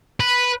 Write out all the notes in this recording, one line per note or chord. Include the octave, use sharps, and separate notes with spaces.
B4